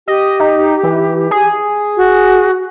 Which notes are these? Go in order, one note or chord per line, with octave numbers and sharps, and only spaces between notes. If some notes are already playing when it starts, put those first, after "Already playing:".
G4 D#5
D#4
E3
G#4
F#4